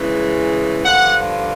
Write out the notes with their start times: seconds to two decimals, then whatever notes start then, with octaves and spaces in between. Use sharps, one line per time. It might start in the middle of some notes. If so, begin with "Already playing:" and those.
Already playing: C#3 E3 G#3
0.85 G2 D3 F3 F#5